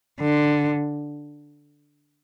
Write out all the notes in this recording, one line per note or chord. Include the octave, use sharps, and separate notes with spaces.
D3